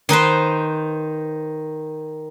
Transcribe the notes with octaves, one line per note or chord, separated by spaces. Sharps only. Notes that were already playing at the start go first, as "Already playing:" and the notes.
D#3 D#4 B4 C5